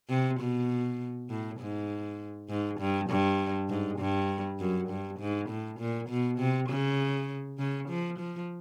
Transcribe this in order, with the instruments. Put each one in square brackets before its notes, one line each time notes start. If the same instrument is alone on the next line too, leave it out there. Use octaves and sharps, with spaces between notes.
[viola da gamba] C3
B2
A2
G#2
G#2
G2
G2
G#2
G2
F#2
G2
G#2
A2
A#2
B2
C3
C#3
C#3
F3
F3